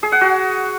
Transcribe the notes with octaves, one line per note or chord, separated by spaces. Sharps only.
G#4
F#5
F#4